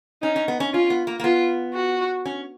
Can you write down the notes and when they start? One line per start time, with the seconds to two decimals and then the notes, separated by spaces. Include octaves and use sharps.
0.22 C#4 D#4
0.36 C#4
0.48 B3
0.60 C#4
0.73 C#4 F4
0.90 B3
1.07 A#3
1.20 A#3
1.23 B3 F4
1.74 F#4
2.26 C#4